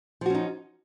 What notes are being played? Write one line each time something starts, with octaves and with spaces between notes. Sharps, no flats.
F3 C#4 D#4 F#4